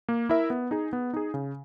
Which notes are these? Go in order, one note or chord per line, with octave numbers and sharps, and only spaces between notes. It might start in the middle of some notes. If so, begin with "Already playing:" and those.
A#3
E4 A#4 E5
B3
D#4 G#4
B3
D#4 G#4
C#3